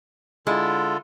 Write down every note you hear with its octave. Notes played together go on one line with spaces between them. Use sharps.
D3 G#3 E4 F4 A4